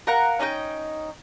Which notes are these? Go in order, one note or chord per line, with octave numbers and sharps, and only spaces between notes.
A#4 F5 F#5 A#5
C#4 D#4 D#5 G5